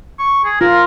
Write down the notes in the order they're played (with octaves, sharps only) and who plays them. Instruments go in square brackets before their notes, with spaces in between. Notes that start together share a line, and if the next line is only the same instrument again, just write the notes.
[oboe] C#6
G#4
[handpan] F4 [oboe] A#4